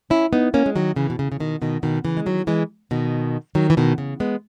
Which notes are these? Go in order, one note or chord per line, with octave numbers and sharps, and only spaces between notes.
C#4 E4
B3 D#4
A#3 C#4
G#3
D#3 F#3
C#3 E3
B2
C#3
C#3
B2 D#3
B2 D#3
B2 D#3
C#3 E3
G#3
D#3 F#3
E3 G#3
B2 D#3
D#3 F#3
E3
B2 D#3
C#3
G#3 B3